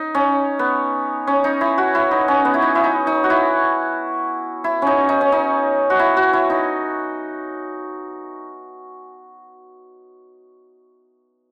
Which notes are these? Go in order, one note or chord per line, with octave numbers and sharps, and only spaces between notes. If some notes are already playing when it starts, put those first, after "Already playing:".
Already playing: D#4
C#4
B3
C#4
D#4
E4
F#4
E4
D#4
C#4
B3
E4
D#4
E4
D#4
D#4
F#4
E4
E4
C#4 D#4
D#4
C#4
D#4
F#4
E4
F#4
E4
D#4